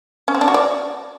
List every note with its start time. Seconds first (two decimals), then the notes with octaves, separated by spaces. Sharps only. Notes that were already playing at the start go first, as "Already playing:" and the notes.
0.28 C#4
0.35 C4
0.41 D4
0.48 F#4
0.54 D5